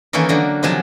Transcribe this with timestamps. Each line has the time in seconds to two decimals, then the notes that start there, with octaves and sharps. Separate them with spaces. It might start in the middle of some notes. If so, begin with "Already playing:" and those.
0.13 D#3 E3 A#3 C#4 A4 A#4
0.29 D3 F#3 A#3 A#4
0.63 C3 D#3 F3 F#3 G#5 A5